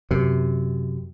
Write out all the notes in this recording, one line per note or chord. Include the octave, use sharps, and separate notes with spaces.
F#2 C3